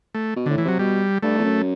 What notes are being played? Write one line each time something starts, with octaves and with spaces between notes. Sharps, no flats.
A3
B2
A2 D3
E3
C3 F#3
B2 G3
G2 A3
E2
F#2